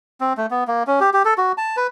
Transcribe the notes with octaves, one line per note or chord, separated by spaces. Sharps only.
C4
A3
B3
A#3
C#4
G4
G4
A4
F#4
A5
B4